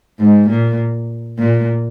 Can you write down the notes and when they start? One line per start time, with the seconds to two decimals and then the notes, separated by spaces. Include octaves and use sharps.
0.19 G#2
0.48 A#2
1.38 A#2